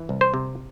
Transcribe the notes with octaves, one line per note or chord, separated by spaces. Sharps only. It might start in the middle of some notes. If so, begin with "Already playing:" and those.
Already playing: E3
C2
C5
C3